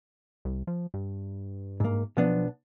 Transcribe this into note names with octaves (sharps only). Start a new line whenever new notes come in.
C2
F3
G2
G#2 A#3
B1 F3 B3 D4